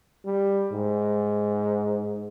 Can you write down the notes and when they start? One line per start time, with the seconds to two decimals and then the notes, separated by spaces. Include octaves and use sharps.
0.25 G3
0.71 G#2